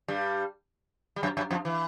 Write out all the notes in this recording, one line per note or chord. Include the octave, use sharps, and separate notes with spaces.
G2 G3
G3
F#2 F#3
F#2 F#3
F2 F3
E3